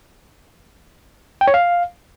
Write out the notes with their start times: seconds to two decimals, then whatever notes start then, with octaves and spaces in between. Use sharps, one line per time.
1.41 G5
1.48 C#5
1.54 F5